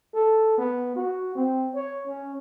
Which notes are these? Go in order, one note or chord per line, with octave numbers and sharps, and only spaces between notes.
A4
B3
F#4
C4
C#5
C#4